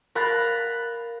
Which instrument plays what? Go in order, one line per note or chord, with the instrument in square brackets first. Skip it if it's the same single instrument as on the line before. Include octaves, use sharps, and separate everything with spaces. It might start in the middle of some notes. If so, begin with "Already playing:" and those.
[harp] A#4 F5 B5 F#6 A6